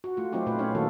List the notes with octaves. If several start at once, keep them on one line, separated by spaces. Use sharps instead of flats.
F#4
A3 F4
F#3 C4 D#4 F4 G4
A#2 A3 F4 B4
C#4 E4 C#5 F5
D#3 F#3 A#3 F#4 A4